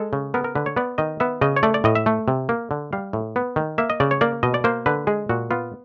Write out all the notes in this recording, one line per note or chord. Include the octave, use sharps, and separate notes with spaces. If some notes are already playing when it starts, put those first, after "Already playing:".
Already playing: G#3 A4
C#3
B3 A#4
A#4
D3 B4
C#5
B3 D5
D#3 D#5
B3 E5
C#3 D#5
C#5
A3 D5
D5
A2 D#5
E5
A3
C3
A#3
D3
G3 F5
A2
B3
D#3
A#3 E5
D#5
C#3 D5
C#5
A#3 D5
B2 D#5
D5
A#3 C5
D3 B4
G#3 G#4
A#2 F#4
B3 F4